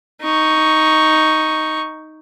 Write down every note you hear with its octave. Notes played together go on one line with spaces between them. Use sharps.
D#4 C#6